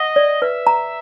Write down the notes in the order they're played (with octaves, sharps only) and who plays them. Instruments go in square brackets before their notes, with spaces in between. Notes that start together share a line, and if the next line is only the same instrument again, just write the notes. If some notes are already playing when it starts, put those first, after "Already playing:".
Already playing: [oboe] D#5 [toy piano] F#5
[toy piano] D5
[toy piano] B4 [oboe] E5
[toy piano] A#5